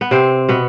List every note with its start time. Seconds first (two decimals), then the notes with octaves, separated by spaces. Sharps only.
0.01 B3
0.11 C3 C4
0.49 B2 B3